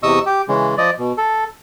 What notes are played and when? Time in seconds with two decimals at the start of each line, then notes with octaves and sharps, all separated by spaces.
0.03 E2 C3 D#5 C#6 D#6 E6
0.26 G4
0.48 C#3 E3 G#3
0.78 F3 D5 D#5
0.98 B2
1.18 A4